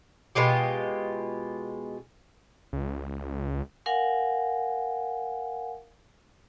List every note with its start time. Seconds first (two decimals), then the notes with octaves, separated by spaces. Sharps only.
0.35 B2 G#3 F4 G4
2.73 C#2
3.86 A#4 F5 F#5 G#5